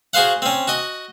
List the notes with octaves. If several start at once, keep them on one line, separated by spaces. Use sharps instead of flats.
F#4 G#4 C5 F5 F#5
C4 C#4
F#4 D#5